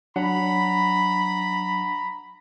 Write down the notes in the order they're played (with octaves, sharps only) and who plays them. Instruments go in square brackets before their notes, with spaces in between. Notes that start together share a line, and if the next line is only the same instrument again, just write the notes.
[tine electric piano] F#3 D4 F#5 [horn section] A#5 B5